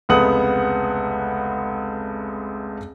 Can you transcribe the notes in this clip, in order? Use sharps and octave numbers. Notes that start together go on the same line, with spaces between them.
F1 C#2 B3 F#5 D#6 F#7